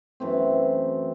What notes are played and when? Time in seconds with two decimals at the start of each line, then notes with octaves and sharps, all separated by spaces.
0.20 F#2 E3 A3 C4